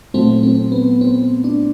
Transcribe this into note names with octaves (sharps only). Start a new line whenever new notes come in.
A#2 F#3 A3 C4
C4
B3
C4
D4